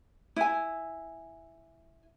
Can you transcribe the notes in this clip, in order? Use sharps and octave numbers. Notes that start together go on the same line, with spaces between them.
E4 G#5